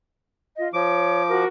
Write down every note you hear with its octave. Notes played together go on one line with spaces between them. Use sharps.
F4 D#5
F3 C#5 D6
F#4 A#4